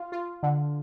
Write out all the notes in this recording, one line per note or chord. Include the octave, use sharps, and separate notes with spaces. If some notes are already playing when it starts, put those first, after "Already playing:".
Already playing: F4
F4
D3